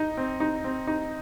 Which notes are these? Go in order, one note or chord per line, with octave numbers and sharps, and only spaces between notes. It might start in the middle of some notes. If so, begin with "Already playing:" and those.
Already playing: D#4
C4
D#4
C4
D#4